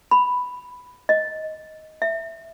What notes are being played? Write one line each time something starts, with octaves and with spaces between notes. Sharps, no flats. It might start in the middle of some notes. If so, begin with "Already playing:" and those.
B5
D#5
E5